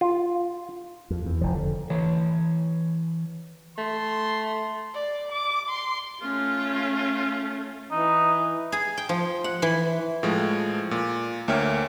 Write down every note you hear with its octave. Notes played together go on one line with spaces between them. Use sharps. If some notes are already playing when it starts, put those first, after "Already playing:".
F4
F2
E2
F1 F3
D3
E3 C#5
A3 C6
D5
D6
C6
A3 C#4 F4
E3 D#4
G#4
G5
F3
F#5
E3
A2 F3 G#3
A#2
D2 A#3 C#5 E5 G5 F6